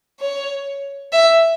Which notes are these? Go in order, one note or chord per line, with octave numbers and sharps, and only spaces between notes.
C#5
E5